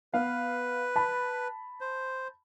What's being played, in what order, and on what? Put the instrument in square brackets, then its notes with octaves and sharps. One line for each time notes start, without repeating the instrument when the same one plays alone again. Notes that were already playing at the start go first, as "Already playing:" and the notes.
[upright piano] B3 F5 [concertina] B4
[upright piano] A5 B5
[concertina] C5